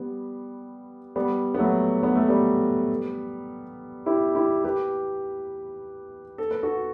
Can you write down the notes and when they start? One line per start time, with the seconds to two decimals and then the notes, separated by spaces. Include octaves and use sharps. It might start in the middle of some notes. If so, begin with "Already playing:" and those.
Already playing: G3 B3
1.16 G3 B3
1.54 B3
1.59 F#3 A3
2.03 B3
2.15 A3
2.28 G3 B3
4.06 E4 G4
4.35 E4 G4
4.64 G4 B4
6.38 A4
6.51 B4
6.63 F#4 A4